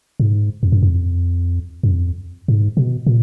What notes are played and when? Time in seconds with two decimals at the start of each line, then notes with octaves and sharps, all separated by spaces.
0.20 G#2
0.63 F2
0.72 F#2
0.83 F2
1.83 F#2
1.91 F2
2.48 G#2
2.77 B2
3.07 A#2